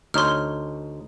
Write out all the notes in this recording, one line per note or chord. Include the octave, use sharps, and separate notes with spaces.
D2 D#4 C#5 C6 F6